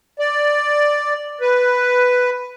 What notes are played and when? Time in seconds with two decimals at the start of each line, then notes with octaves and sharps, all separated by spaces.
0.19 D5
1.41 B4